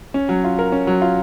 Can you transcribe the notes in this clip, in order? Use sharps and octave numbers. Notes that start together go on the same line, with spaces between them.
C#4
F#3
F4
A#4
C#4
F#3
F4